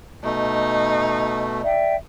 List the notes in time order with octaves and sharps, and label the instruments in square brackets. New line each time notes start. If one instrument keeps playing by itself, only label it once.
[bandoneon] B2 A3 [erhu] D#4
[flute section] D5 E5 G5